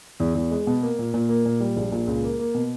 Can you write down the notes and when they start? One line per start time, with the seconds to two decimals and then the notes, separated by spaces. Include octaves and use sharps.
0.20 E2
0.35 E2
0.51 G#3
0.67 B2
0.82 A#3
0.99 A#2
1.14 A#2
1.29 A#3
1.46 A#2
1.60 G3
1.77 A#1
1.92 A#2
2.07 C#2
2.24 A#3
2.39 A#3
2.54 B2